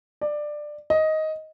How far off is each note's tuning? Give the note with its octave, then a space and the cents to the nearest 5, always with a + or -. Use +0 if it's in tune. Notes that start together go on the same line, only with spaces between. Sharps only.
D5 +15
D#5 +10